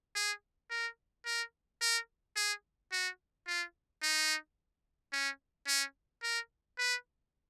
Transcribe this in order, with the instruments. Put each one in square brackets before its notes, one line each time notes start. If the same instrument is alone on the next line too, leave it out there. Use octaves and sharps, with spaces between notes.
[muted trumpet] G#4
A#4
A#4
A#4
G#4
F#4
F4
D#4
C#4
C#4
A#4
B4